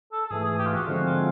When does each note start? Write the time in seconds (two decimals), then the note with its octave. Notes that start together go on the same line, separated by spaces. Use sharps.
0.12 A4
0.26 A4
0.30 G#2 E3 A3 G#4
0.45 G#4
0.59 G4
0.66 F4
0.73 F#4
0.87 D3 F3 G#3 C4 F#4
1.06 F4